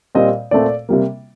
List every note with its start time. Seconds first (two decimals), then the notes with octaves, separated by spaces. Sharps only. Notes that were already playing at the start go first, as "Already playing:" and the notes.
0.15 A#2 G3 C4 D#5
0.51 A#2 A3 C4 D5
0.89 C3 G3 A#3